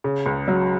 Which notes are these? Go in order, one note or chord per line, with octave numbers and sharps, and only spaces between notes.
C#3
C#2
F#3